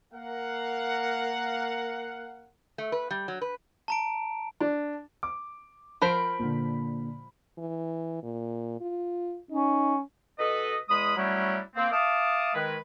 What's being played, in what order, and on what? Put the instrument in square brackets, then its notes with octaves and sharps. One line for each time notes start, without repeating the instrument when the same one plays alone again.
[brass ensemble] A#3 A#4 F5 F#5
[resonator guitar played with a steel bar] A3
B4
G3
F#3
B4
[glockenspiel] A5 A#5 D7
[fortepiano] D4
[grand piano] D6
[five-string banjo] F3 A#4 C5 [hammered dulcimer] B5 [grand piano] B6 D7
[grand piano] A#2 D3
[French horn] E3
A#2
F4
[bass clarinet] C#4 [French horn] D#4
[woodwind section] B2 A4 B4 D#5
E2 G#3 B5 D#6
F#3 G3 A3 C#4 D4 E4
A#3 C4
E5 F5 A5 D6 D#6
D#3 G#3 B4